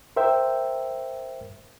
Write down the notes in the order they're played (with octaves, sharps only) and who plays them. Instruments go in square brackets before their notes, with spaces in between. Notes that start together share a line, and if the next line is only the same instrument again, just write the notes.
[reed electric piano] A#4 C5 E5 G5